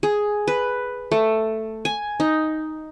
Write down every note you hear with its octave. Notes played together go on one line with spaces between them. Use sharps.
G#4
B4
A3
G#5
D#4